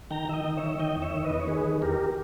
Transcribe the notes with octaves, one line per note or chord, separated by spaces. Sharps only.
D#3 G5 A#5
D#3 D#5 E5 G5
D#3
C#5 E5
D#3
D#3 D#5 G5
E2
C#5 E5
D#3
B4 D#5
E2
C#5
D#3 G#4 B4
D#3
E2 G4 A#4